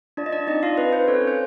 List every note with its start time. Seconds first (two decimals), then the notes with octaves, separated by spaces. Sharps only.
0.17 D4 F4 D5
0.26 D#5
0.32 D4 D5
0.47 C4 D#4 D#5
0.63 F4 F5
0.78 C4 B4
0.93 C5
1.07 C#4 A4 C#5
1.27 C5